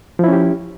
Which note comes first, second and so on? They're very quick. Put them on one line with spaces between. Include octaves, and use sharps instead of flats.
F3 E4 C#4 G4